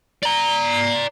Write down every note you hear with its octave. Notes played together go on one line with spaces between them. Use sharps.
D5 A#5